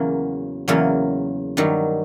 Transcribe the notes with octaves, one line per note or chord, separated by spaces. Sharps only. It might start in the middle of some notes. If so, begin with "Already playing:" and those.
Already playing: E2 C#3 F#3 A#3
E2 C#3 F#3 A#3
G2 D#3 F#3